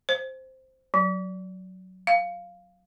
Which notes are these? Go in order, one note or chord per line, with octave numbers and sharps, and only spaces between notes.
C5
F#3
F5